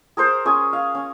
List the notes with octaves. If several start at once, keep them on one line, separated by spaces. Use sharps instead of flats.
G#4 A#4 C5
C#4 G#4 G#5
F5
C#4